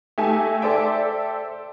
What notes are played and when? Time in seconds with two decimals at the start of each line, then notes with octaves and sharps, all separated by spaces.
0.18 A3 D#4 G4 A4 E5 G#5
0.62 A4 C5 D5 E5 G5